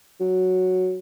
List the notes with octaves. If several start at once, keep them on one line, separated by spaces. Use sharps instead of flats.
F#3